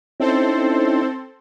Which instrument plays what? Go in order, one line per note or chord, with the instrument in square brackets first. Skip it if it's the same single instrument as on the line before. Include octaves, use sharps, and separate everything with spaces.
[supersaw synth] C4 A4 C5 [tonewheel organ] C#4 D#4 E4